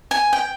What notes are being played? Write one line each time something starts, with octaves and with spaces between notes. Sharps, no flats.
G#5
G5